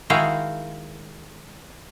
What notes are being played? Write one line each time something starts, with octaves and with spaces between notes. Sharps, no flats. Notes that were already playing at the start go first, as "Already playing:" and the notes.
D#3 G#3 E4 F#4 F5 G5